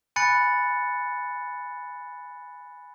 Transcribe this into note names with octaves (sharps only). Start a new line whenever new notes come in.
G#5 B5 F#6 A6 C#7